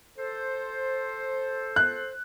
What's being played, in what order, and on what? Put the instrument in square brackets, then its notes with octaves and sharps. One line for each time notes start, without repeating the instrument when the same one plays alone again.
[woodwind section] A4 C5
[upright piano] F#6